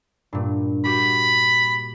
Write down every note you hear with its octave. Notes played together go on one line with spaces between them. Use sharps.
G2 A#2
F#4 G4 B5